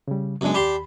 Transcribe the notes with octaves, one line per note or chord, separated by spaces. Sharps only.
C#3 G3
F#2 C#3 G#3 B3 D4
D#2 D4 G4 B5 C6